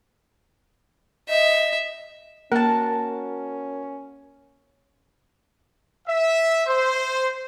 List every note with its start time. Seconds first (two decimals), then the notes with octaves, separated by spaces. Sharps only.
1.29 D#5 E5
2.52 A#3 C#4 F#4 A#4 A5
6.07 E5
6.67 C5